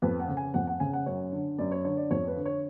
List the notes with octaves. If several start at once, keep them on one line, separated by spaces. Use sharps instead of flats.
F2 B4
F#5
C#3
G#5
F2 F#5
F#5
C#3 G#5
F#5
F#2 C#5
D3
F#2 D5
C#5
D3 C#5
D5
F2 C#5
B4
D3
C#5